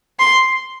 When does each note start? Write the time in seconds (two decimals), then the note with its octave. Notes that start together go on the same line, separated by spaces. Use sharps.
0.19 C6